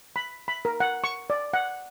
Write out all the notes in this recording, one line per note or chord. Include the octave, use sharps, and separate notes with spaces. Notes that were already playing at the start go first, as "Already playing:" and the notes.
B5
B5
A#4
F#5
C#6
D5
F#5